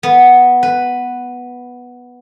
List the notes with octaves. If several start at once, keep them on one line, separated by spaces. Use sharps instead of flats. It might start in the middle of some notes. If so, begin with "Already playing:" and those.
B3
B4